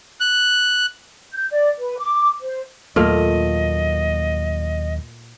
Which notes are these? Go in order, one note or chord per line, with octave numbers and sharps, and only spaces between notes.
F#6
G6
D5
B4
D6
C5
D#2 A#2 F#3 A3 A#3 D#5 F5